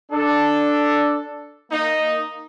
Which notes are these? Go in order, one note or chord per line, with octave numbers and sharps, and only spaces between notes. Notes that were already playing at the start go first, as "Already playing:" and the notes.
D4 A4
A#3 D#4